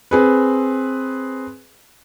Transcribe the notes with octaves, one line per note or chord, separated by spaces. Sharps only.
C4 G#4 B4